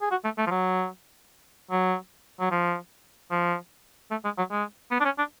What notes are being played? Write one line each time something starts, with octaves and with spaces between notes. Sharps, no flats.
G#4
F#4
A3
A3
F3
F#3
F#3
F#3
F3
F3
A3
G#3
F#3
G#3
B3
D4
C#4
D4